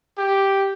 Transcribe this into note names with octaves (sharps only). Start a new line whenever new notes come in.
G4